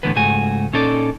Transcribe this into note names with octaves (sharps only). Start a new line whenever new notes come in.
A2 D3 E3 B3 B4
C#2 G#2 A3 F#4 G#5
A#2 C#4 D#4 A4 C#5 D5